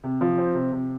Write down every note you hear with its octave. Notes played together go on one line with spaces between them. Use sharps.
C3
F3
C4
C3
C3